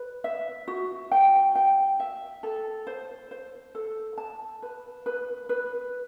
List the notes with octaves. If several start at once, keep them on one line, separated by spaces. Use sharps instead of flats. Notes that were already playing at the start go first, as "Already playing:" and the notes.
Already playing: B4
E5
F#4
G5
G5
E5
A4
C5
C5
A4
A5
B4
B4
B4